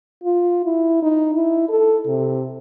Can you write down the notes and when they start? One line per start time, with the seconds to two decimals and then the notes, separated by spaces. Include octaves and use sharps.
0.24 F4
0.65 E4
1.02 D#4
1.34 E4
1.69 A4
2.07 C3